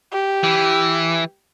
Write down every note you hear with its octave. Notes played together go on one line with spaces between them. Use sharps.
G4
E3